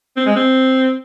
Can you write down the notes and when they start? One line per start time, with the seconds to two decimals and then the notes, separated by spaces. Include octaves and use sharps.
0.17 C4
0.26 G#3
0.36 C4